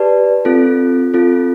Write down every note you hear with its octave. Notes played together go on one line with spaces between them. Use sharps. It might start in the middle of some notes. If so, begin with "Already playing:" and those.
Already playing: G4 B4 D5 A5
C4 F4 A4
C4 F4 A4